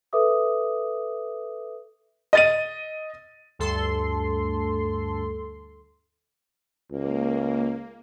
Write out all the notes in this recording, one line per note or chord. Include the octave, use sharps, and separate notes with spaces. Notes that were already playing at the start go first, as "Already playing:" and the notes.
A4 B4 E5 D6 D#6
D#5 A6 D#7
D2 G2 A4 C6
C#2 A#3